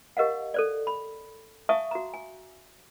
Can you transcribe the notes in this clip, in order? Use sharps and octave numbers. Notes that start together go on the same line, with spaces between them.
G4 A#4 D#5 F5 F#5
A4 C5 D5
B5
E5 F5 G#5 A5 C#6 D#6
F#4 A#5
G#5